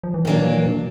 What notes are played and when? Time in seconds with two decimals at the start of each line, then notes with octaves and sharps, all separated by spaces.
0.03 F3
0.14 E3
0.25 A#2 D#3 F#3 A#3 D4
0.39 E3
0.52 E3
0.66 B2